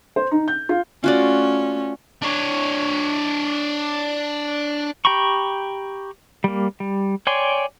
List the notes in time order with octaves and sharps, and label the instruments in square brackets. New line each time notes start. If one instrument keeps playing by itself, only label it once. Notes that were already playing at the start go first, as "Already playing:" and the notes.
[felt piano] C5
D#4
G6
F4
[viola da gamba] A3 C#4 [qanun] F4 F#4 D5
[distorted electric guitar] D4 C#5
[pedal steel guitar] G4 G5 A#5 B5 C#6
G3 A#3
G3
C#5 D5 G5 G#5 C6